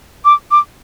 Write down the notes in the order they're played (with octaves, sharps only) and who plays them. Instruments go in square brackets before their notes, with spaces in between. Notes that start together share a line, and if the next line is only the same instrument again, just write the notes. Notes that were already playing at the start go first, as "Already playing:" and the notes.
[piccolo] D6
D6